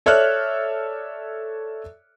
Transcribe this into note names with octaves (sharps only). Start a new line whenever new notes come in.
A4 C#5 D5 E5 F6 F#6